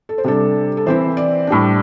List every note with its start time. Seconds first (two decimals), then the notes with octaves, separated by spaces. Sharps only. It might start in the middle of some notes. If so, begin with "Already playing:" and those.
0.09 A4
0.18 C5
0.24 C3 G3 D4 A4
0.77 A4
0.86 E3 C4 E4 C5
1.17 D5
1.47 A2 G3 D4